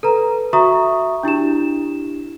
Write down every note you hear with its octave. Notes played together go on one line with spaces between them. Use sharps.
A4 B4 A#5
F#4 E5 A#5 C#6 D#6
D4 E4 G4 E7